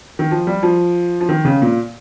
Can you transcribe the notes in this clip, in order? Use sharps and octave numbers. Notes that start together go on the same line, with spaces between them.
D#3
F3
G3
F3
F3
D#3
C#3
A#2